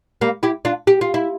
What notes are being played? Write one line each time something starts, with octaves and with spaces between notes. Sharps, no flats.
G3 A#3
E4 G4
D4 F4
G4
F4
E4